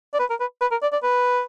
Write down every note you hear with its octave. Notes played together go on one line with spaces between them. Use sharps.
D5
B4
A#4
B4
B4
A#4
D5
D5
B4